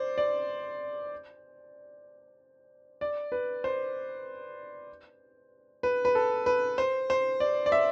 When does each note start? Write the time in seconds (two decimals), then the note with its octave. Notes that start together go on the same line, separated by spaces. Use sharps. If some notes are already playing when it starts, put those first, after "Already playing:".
Already playing: C5 D5
0.18 D5
3.01 D5
3.32 B4
3.64 C5
5.83 B4
6.05 B4
6.15 A4
6.46 B4
6.78 C5
7.10 C5
7.40 D5
7.66 D5
7.72 E5